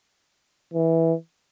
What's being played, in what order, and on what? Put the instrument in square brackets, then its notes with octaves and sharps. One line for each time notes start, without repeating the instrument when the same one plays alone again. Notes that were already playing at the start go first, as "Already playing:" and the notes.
[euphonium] E3